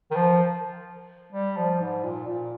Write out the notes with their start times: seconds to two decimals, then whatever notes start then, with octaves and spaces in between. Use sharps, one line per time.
0.11 D#3
0.16 F3
1.33 G3
1.57 F3
1.80 G#2
2.04 A#2
2.27 A#2